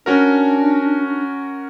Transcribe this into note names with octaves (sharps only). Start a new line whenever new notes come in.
C#4 D4 F#4 A#4